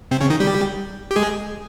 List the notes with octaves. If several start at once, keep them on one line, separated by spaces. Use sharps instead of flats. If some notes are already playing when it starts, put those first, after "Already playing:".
C3 C4
C#3 C#4
D#3 D#4
G3 G4
G4
G#3 G#4